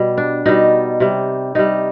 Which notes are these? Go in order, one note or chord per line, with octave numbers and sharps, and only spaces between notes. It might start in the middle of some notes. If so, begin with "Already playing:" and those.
Already playing: B2 G3
D4
B2 G3 D#4
C3 G3
C3 G3 D#4